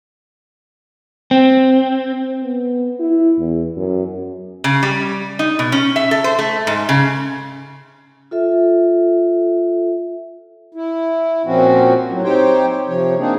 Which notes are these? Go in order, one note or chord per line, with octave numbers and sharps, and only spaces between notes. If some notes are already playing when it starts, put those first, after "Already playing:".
C4
B3
E4
E2
F#2
C#3
G3
D#4
B2
C#4
E5
A4
C5
A3
G#2
C#3
F4 A4 E5
E4
A#2 F3 C4 C#4 F#4
A2 F#3
C4 D#4 G4 C5 C#5 G5
C3 F3 C#5
A#3 C4 D4 D#4 G#4